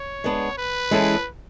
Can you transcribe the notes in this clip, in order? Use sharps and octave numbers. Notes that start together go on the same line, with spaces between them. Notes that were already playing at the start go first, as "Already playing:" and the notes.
Already playing: C#5
G#3 B3 D4
B4
E3 G#3 C#4 E4 A4